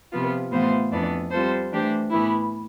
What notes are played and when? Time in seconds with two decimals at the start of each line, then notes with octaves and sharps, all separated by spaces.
0.12 C3 F3 B3 F4
0.51 A2 E3 B3 F4 C5
0.91 F2 E3 B3 D4
1.31 G3 C4 F4 A4 C5
1.70 E3 A3 D4 G4 C5
2.10 A2 E3 B3 E4